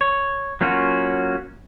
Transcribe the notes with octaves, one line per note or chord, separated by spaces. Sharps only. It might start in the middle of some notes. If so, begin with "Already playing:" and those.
C#5
F#3 A#3 C#4 F4 F#4